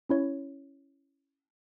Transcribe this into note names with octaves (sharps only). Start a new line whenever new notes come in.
C#4 E4 C#5